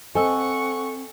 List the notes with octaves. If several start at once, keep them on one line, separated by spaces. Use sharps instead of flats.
C4 A4 C5 D#5 F#5 G#5 C#6 E6